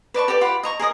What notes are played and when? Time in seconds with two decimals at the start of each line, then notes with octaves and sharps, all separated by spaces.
0.14 B4 D5 A5 C#6
0.28 G4 A4 D5 G5
0.41 F4 G4 F#5 B5
0.63 D#5 A#5 C#6
0.79 G#4 A#4 D#5 D#6